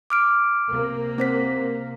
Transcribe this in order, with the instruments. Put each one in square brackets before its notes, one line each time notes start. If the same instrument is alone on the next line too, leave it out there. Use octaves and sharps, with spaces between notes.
[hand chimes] D6 F6 D7
[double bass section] C3 A#3
[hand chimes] C4 C5 B6